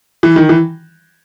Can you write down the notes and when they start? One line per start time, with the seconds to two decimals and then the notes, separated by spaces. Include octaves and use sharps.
0.23 E3
0.36 D#3
0.49 E3